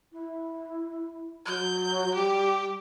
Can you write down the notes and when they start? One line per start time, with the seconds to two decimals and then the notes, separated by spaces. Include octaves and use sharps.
0.12 E4
1.46 F#3 G6
2.15 G3 G4